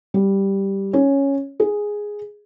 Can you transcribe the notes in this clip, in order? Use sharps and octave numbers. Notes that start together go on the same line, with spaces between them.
G3
C#4
G#4